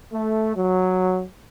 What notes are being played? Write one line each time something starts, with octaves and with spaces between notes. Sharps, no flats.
A3
F#3